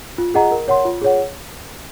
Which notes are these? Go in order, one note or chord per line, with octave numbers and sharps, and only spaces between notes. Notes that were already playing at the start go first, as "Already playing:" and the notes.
F4
G#4 D#5 F#5 A#5
A#4
C#5 F#5 C6
F4
G#4 C#5 F#5